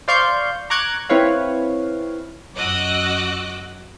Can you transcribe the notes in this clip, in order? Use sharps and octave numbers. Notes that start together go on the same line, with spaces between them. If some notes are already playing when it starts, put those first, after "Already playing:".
C5 D5 F5 C6 C#6 G6
A#5 C#6 D6 F#6 G#6
C4 E4 B4 C#5 F5
F#2 F#4 D#5 D6 E6 F#6